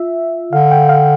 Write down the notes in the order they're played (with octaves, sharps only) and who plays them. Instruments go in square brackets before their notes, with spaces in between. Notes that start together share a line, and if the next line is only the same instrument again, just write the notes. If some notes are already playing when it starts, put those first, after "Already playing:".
Already playing: [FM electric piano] F4 E5
[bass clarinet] D3 [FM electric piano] F5
[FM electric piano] G5
F5